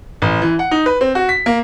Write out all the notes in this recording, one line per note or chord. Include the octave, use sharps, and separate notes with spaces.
A1
E3
F#5
D#4
B4
C4
F#4
B6
A#3